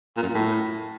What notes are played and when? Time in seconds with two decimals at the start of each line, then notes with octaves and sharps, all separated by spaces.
0.17 A#2
0.23 F#2
0.29 A#2
0.34 A2